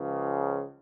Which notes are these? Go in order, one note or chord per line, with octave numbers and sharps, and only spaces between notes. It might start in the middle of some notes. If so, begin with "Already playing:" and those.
Already playing: C#2 C#3 F3